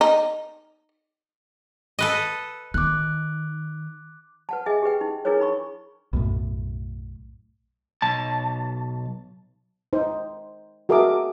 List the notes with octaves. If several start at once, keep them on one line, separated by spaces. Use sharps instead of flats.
D#4
A4 B4 D#5
D#3 D6 F#6
B4 F#5 A5
G#4 D#5 E5 G#5
G4 G#4 B4 G5
D#4
D4 E4 G#4 A#4 B4 C#5
D#4 B5 C#6
B1 F#2 A2
B1 A5
D#4 C5
F#4 G#4 A#4 E5 A5 D6